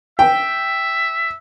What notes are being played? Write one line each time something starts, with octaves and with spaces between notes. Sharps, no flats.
E5 G5